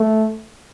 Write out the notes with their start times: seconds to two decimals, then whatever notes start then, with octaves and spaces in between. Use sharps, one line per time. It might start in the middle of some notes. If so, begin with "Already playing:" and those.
Already playing: A3